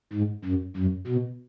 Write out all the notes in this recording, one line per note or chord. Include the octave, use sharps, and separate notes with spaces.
G#2
F#2
F#2
B2